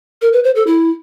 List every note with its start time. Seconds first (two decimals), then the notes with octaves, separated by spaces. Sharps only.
0.22 A#4
0.33 B4
0.44 C5
0.55 A4
0.67 E4